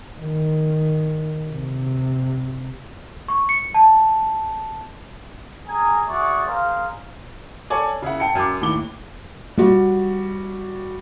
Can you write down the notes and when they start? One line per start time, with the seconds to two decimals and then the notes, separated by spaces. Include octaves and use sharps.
0.18 D#3
1.50 C3
3.28 C#6
3.49 C#7
3.74 A5
5.68 C#4 G#4 G#5 A#5
6.07 F#4 G#4 D5 E5 C#6
6.47 G#4 A#4 C5 F5
7.70 A4 C#5 D5 G#5
8.02 C#3 E4 F#5
8.20 G5 A5 C#7
8.35 F#2 D6
8.61 D#2 A2 D6 G7
9.57 G3 F#4